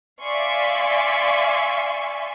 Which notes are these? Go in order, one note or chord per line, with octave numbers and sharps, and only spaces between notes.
D5 E5 F5 G#5 C6 C#6